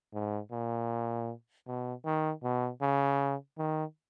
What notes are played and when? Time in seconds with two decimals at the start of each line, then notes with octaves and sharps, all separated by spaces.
0.14 G#2
0.52 A#2
1.67 B2
2.05 D#3
2.43 B2
2.82 C#3
3.58 D#3